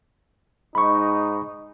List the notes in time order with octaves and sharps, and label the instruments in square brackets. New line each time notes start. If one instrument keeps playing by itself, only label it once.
[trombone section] G#2 D#4 [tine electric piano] B5 C#6